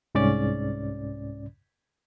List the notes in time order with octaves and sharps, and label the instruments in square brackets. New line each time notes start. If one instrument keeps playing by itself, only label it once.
[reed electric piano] C2 G#2 C#4 D5 A6